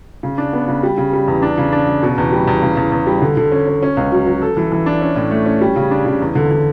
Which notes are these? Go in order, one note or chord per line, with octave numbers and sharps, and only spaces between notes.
C#3
D4
B3
C#3
G3
C#3
G3
E2
D4
C#3
D4
C#3
B2
E2
G3
E2
C#3
E2
E2
G3
D3
D3
C#4
C#4
C#4
C#2
F#3
F#3
A4
E3
E3
D4
C#4
A2
A3
C#4
G3
C#3
D4
C#3
E2
D3
D3